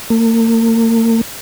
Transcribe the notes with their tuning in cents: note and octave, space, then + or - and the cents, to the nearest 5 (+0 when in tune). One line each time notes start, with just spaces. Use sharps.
A#3 -40